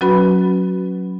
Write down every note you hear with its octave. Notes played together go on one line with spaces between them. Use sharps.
F#3 C#4 F#4 B4 B5